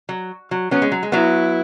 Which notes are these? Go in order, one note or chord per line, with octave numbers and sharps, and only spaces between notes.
F#3
F#3
F#3 B3 C#4
G#3
F#3
G#3
F#3 B3 E4